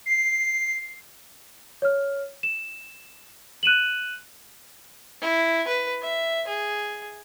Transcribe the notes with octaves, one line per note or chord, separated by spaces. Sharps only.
C7
C#5 F6
E7
F#6 D#7 E7 F#7
E4
B4
E5
G#4